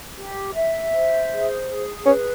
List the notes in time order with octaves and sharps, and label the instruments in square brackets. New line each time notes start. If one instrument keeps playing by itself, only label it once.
[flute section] G4
E5
C5
G#4
G#4
[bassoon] C#4 [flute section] B4